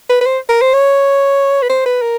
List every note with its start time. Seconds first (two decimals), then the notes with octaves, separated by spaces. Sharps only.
0.09 B4
0.21 B4
0.26 C5
0.49 A#4
0.62 C5
0.74 C#5
1.62 B4
1.70 C5
1.86 B4
2.02 A#4